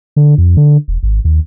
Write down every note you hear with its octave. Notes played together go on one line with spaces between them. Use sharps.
D3
F2
D3
E1
G#1
D#2